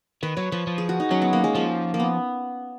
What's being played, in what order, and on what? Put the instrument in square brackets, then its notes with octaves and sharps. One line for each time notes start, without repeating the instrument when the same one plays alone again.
[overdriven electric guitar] D#3 [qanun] B4
[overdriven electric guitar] F#3 [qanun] C#5
[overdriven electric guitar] F3 [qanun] B4
[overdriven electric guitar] F3
[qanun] G#4
F#4
D#4
[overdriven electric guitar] F#3 [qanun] C#4
[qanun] B3
A#3
G#3
[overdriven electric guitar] F3 [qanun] A#3
[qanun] A#3
B3